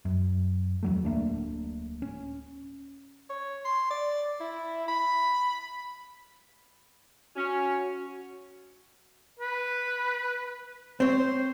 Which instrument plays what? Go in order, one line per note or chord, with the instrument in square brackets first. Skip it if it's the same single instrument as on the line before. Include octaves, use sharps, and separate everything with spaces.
[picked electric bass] F#2
E2 F#3 A3
D1 A3 A#3 D4
C#4
[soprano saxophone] C#5
C6
D5
E4
B5
[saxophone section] C#4 [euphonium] F#4
[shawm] B4
[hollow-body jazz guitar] C4 C#5 [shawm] C5